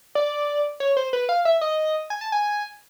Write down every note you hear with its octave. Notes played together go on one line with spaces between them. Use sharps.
D5
C#5
C5
B4
F5
E5
D#5
G#5
A5
G#5